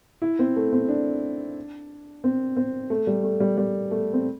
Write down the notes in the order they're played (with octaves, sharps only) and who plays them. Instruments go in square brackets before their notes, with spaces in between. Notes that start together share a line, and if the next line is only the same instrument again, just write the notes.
[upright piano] E4
C4
A3
C4
D4
C4
C4
A3
G3
A3
G3
G3
A3
C4